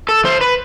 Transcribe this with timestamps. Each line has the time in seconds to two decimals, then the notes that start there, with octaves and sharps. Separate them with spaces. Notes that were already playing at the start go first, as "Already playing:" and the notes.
0.09 A4
0.24 E3 C5
0.41 B4